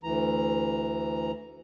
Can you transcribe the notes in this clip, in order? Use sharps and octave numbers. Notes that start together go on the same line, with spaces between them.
D2 E3 A#5